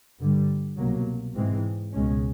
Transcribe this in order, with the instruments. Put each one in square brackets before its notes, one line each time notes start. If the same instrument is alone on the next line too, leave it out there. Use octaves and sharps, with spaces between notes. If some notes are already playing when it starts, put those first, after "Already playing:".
[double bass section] G2 D3 G3
C2 B2 F#3 A#3
G#2 E3 G#3 C4
C#2 B2 G#3 C#4